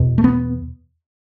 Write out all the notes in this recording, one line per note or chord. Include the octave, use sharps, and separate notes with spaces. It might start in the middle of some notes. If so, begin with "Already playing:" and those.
Already playing: E2 B2
A3
B3